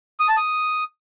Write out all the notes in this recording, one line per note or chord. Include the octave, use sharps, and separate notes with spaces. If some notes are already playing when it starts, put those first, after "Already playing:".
D#6
A5
D#6